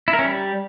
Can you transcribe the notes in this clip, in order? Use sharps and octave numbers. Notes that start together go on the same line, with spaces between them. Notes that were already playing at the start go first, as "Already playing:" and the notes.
E4
A#4
C#4
G3